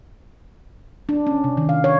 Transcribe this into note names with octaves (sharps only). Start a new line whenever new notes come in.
D4
C#4
C3
D#3
F5
C#5